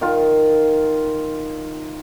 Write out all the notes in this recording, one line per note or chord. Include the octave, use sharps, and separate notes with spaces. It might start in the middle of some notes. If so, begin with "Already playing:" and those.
D#3 F4